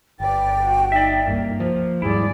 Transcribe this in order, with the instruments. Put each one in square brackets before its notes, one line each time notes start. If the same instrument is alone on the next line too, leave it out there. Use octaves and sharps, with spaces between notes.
[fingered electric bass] G1 [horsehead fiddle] B4 D5 [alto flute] G5
[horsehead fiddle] F#4
[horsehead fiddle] D#4 [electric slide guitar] D5 E5
[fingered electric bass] C#2 G2 [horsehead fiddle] A#3
[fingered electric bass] F3 [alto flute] C5
[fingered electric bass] D#2 G#2 G3 [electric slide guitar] E4 [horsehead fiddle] G#4 D5